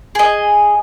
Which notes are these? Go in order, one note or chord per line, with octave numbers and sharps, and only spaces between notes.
G#4 D#5